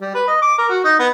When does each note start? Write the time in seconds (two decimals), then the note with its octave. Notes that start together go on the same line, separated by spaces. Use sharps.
0.01 G3
0.15 B4
0.28 D#5
0.42 D6
0.58 A#4
0.69 F#4
0.84 D#4
0.99 B3